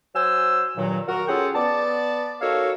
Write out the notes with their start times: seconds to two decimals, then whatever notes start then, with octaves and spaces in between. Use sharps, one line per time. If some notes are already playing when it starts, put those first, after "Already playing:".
0.14 F#3 C5 G#5 E6
0.78 G2 A#2 D#3 F#3
1.08 F#4 A#4
1.28 C#4 F4 G#4 A4 F#5 G5
1.56 B3 D5 A5
2.40 D#4 F#4 A4 A#4 C#5 F5